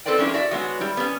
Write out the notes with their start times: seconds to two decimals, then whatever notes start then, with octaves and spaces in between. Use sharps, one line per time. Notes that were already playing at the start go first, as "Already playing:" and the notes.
0.05 C4 A4 B4 C5 D5 G5
0.18 F3 G#3 C#4 D4 E4
0.34 F#4 D5 E5
0.51 F#3 G#3 B3 F#4
0.80 G3 E4
0.97 B3 C#4